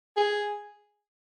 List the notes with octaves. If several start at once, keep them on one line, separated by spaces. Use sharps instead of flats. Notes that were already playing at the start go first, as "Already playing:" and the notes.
G#4